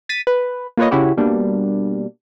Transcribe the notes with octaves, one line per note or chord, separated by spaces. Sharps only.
A6 B6 D#7
B4
A#3 F4 B4 C#5 D#5
C#3 C#4 E4 F#4 G4
B2 G3 A#3 D4